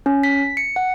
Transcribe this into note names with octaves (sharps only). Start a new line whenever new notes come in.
C#4
B6
C#7
F#5